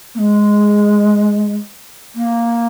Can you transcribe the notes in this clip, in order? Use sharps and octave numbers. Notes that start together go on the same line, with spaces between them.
A#3
G#3
A#3